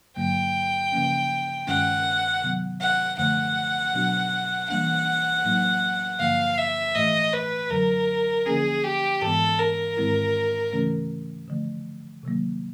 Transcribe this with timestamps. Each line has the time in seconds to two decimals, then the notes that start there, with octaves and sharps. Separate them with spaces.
0.16 G2 D3 F#3 A#3 G5
0.92 C#3 F3 A#3 C#4
1.67 G2 D#3 G#3 C#4 F#5
2.43 C3 D#3 F#3 B3
2.81 F#5
3.18 F#2 D3 F3 A3 F#5
3.94 B2 F#3 B3 D4 F#4
4.69 E3 G3 A#3 D4 F#5
5.44 A2 F#3 A#3 D#4
6.20 G2 D3 F3 A#3 F5
6.58 E5
6.95 A2 E3 A3 D#5
7.33 B4
7.71 F#2 D3 F#3 A#4
8.46 D3 F3 A#3 C#4 G#4
8.84 G4
9.21 G#2 E3 G#3 B3 A4
9.59 A#4
9.97 G#2 D#3 G#3 C4 E4
10.72 C#3 E3 A3 C#4
11.48 D3 F3 A3
12.23 C3 D#3 F#3 A#3